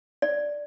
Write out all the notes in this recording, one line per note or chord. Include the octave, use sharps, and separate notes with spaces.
D5